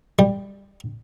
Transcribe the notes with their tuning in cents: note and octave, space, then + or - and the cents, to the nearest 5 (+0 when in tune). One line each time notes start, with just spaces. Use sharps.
G3 +15